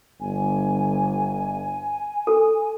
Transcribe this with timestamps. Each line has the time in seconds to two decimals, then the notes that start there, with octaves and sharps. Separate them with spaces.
0.21 G1 G#5
2.27 A4